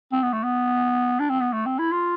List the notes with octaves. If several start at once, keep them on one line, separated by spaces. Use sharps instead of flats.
C4
B3
A3
B3
D4
C4
B3
A3
C4
E4
F4